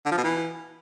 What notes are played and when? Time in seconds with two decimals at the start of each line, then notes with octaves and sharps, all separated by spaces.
0.06 D3
0.12 F3
0.18 B2
0.24 E3